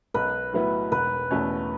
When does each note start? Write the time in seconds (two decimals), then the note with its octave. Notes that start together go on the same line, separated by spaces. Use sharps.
0.14 B1 B4
0.53 A2 F#3 B3 E4
0.91 E1 B4
1.31 E2 B2 A3 C#4